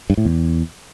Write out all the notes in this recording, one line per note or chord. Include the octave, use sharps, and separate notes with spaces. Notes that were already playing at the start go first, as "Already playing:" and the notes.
G2
A2
E2